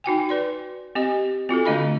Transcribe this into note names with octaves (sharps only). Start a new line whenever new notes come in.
D#4 F#4 G5 G#5
B4 D5 C6
C4 G4 D#5
C4 F4 F#4 A4
D3 A3 D4 D#5 F5 B5